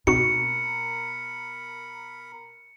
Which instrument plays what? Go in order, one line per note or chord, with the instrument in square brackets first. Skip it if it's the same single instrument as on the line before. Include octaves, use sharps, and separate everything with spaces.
[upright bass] B2 [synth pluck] C4 D#4 F#4 [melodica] A#4 B5 [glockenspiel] C#7